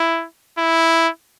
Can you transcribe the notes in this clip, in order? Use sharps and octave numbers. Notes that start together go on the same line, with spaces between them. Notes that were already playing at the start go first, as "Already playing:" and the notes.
Already playing: E4
E4